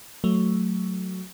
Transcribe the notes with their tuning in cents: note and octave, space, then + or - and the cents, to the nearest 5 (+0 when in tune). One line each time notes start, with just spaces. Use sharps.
F#3 +0 A3 +0